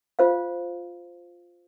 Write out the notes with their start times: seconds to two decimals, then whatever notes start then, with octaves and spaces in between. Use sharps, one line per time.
0.19 F4 C5 F5